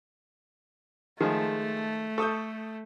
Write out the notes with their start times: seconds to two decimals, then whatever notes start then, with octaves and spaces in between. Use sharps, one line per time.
1.21 D#3 F3 G#3 A3 G#4
2.18 A4 C#6 D#6 G6